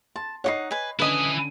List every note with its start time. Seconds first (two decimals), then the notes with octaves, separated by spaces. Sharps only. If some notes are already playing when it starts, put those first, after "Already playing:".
0.16 A5 C6
0.44 D#4 F#4 C#5 D#5 F#5 C7
0.71 B4 G#5
0.99 D3 C#4 D4 E4 B4 D#5 G#5 D#6